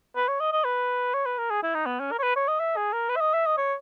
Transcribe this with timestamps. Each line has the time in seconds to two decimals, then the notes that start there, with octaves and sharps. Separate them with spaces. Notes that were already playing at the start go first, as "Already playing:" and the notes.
0.16 B4
0.28 C#5
0.40 D#5
0.52 D#5
0.65 B4
1.14 C#5
1.26 B4
1.39 A#4
1.51 G#4
1.63 E4
1.75 D#4
1.86 B3
2.00 C#4
2.12 A#4
2.19 C#5
2.23 B4
2.36 C#5
2.48 D#5
2.60 E5
2.77 G#4
2.93 A#4
3.09 B4
3.16 E5
3.21 D#5
3.34 E5
3.46 D#5
3.57 C#5